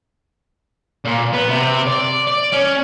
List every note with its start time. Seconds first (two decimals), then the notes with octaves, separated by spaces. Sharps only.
1.05 A#2
1.33 B3
1.49 C3
1.87 D5
2.28 D5
2.53 C#4